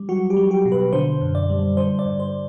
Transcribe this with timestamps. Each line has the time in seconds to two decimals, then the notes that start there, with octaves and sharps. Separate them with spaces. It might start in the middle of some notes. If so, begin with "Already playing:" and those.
Already playing: G3
0.09 F#3 F#4
0.30 G4
0.37 F#3
0.51 G4
0.65 B2
0.72 B4
0.93 D3 C5
1.21 F#2
1.35 D5
1.50 G3
1.77 D3 C5
1.99 D5
2.05 G2
2.19 C5